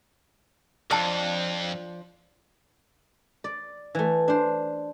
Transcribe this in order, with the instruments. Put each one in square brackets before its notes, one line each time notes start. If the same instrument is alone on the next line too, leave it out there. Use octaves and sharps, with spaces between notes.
[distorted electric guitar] F2 [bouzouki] F3 D4 D5 [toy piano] A5 E6
[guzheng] D5
E3 A3
D4 C5